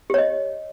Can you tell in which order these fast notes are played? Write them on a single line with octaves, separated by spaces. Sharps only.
G4 C#5 D#5